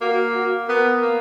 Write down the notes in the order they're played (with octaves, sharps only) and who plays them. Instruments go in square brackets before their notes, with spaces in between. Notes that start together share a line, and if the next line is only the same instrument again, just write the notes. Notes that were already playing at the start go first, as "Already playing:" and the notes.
[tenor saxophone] A#3 [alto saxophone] F#4
[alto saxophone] F#4
[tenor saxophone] B3 [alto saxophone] A#4
[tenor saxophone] A#3